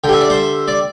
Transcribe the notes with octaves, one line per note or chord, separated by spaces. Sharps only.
D3 G3 E5 G5
D5
C5 E5
D5